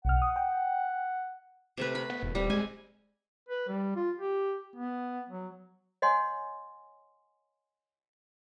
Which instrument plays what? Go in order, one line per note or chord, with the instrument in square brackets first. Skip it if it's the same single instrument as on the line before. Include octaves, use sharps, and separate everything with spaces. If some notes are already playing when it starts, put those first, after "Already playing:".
[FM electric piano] B1 B2 F6 [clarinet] F#5
[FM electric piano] D#6
G5
[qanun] C3 A3 B4
B5
[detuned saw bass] B3
E1
[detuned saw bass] D#1 [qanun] G3 C4
[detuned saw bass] G#3 [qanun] G#5
[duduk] B4
G3
F4
G4
B3
F#3
[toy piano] C#5 D#5 F#5 G#5 C6